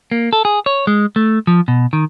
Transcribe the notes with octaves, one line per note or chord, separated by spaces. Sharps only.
A#3
A4
G#4
C#5
G#3
A3
F3
B2
D#3